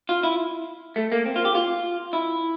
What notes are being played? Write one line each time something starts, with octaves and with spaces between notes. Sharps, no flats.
F4
E4
A3
A#3
C4
F4
G4
F4
E4